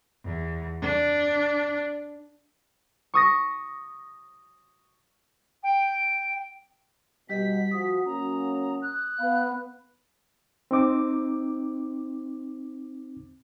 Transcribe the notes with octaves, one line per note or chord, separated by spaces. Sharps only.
E2
D4
C#6 D#6 A#6
G5
B2 G3 G4 D#5 B6
F3 F#4 D#6
F#3 A#3 C#4 A#5
F#6
B3 B4 F5 B5
C4 D#4 D6